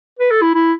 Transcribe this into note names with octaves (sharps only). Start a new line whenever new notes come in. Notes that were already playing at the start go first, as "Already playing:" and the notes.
B4
A4
E4
E4